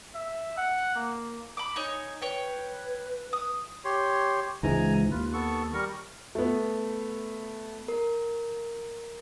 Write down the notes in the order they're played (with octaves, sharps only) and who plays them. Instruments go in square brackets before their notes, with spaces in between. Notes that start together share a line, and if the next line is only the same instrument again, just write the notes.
[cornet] E5
F#5
A#3
[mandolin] B5 D6
D#4 C#5 G#5
[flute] B4 [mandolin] C#5 G5
[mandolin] D#6
[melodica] G4 C#5 C6
[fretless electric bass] C#2 G#2 E3 [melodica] G#5 A#5
[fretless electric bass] D#2 [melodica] F4 B4
[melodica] B3 A4 C#6
G3 A#4 C#6
[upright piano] A3 B3
[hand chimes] A#4